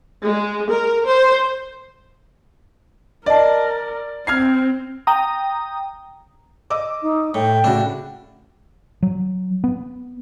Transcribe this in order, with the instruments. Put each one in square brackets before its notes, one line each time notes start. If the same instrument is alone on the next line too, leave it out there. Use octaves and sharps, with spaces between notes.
[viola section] G#3
A#4
C5
[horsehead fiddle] A#4 [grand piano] D5 [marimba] D#5 A5
[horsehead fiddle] C4 [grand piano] F6 G#6 C7
[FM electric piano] G5 A#5 D#6
[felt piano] D#5 D6 E6
[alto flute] D#4
[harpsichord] A2 [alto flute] G5
[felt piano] A2 C#3 F#4 [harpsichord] D4
[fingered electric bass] F#3
B3